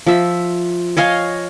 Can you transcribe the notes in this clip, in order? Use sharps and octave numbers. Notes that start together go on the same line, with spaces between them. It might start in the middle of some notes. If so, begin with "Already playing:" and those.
F3 E5
C#5 D#5 F5 G#5